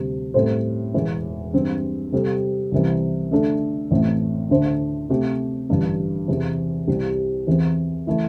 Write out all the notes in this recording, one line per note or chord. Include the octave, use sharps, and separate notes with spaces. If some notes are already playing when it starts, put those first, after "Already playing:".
Already playing: D2 C3 G3
A2 G3 C4 A4 C5
E1 E2 E3
G2 E3 C4
C3 G3 C4 A4
C2 C3 E3
D3 A3 D4 A4
A1 A2 A3 C4
D2 D3 A3 D4 C5
C3 A3 C4 G4
A1 G2 D3
E2 C3 E3
C2 C3 G3
E2 E3 C4
E3 A3 E4